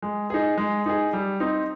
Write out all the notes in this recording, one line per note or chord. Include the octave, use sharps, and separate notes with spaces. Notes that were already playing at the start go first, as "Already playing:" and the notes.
G#3
D#4 G#4
G#3
D#4 G#4
G3
C4 D#4